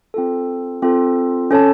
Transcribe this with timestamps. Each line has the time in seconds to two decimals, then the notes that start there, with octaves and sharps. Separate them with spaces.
0.14 C4 F4 A4
0.82 C4 F4 A4
1.51 C#4 A4 C#5 A5